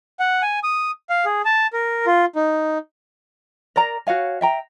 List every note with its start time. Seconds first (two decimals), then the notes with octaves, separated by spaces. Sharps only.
0.20 F#5
0.42 G#5
0.63 D#6
1.10 F5
1.25 G#4
1.45 A5
1.73 A#4
2.06 F4
2.36 D#4
3.76 A#4 D5 A#5
4.07 F#4 C#5 F5 G#5
4.41 E5 G5 A#5